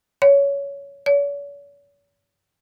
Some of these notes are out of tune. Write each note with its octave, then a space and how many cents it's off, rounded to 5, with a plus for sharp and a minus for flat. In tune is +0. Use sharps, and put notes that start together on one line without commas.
C#5 +15
C#5 +45